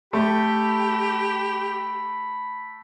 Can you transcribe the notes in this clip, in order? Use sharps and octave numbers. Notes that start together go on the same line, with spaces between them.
A3 G4 B5